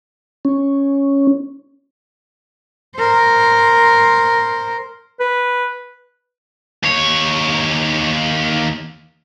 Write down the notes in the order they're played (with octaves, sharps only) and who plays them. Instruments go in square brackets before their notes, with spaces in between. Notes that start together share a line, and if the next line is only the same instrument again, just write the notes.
[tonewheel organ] C#4
[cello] A#4 C5
[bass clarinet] B4
[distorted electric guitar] D#2 C#5